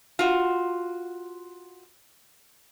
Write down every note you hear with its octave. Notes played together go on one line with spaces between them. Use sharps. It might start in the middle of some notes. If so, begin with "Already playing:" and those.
F4 F#4